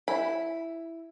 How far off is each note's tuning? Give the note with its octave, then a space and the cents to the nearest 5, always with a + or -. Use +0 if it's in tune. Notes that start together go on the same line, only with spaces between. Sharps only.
E4 +5 B5 +0